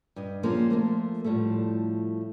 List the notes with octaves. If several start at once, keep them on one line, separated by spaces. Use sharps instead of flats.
G2 D#5
F3 G#3 A#3 C#4
F3 A3 A#3
A2 F3 G3 A3